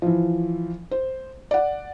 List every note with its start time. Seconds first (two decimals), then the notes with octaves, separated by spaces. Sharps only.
0.02 E3 F3
0.91 C5
1.51 D5 F#5